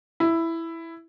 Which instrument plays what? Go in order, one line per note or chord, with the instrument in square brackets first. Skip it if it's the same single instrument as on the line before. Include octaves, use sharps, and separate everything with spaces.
[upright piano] E4